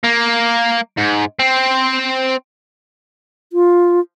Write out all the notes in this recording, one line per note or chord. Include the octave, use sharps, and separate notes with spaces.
A#3
G#2
C4
F4